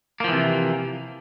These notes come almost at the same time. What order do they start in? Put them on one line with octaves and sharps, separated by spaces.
A#3 F3 E3 C3